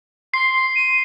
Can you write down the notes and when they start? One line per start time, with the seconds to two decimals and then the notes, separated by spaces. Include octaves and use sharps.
0.34 C6 C7
0.76 D#7